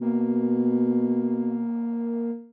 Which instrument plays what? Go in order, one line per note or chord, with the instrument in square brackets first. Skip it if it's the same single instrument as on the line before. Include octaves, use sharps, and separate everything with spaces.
[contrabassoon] B2 [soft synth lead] A#3